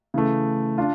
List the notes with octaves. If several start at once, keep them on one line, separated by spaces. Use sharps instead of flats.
C#3 E3 A3
D4 F4